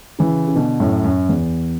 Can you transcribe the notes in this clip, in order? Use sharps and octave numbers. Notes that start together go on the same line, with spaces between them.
C#3 E3
C#3
B2 D3
F#2 A2
F#2
E2